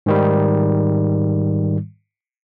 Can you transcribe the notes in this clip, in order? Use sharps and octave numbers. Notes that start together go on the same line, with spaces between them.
G#2 D#3 G3